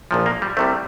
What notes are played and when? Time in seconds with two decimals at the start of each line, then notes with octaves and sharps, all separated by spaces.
0.11 A#1 A#2 F3
0.26 A#3
0.42 G3
0.57 C2 C3 G3 A3